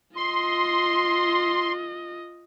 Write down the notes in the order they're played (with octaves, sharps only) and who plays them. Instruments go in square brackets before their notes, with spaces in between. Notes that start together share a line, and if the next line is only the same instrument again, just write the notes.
[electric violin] F4 D#5 [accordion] C6